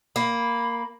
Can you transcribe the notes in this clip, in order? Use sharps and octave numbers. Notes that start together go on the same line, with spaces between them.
A#3 B5